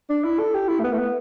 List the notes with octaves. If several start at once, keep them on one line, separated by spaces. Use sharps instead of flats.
D4
E4
A4
G4
E4
A3
B3
A3
B3